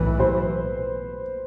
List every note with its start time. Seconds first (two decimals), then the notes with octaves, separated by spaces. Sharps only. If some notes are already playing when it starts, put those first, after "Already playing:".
Already playing: B1 A2 E3 B4
0.20 C5